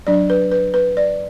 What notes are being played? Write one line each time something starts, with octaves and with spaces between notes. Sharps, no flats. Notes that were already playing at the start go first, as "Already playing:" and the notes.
F#3 D4 D5
B4
B4
B4
D5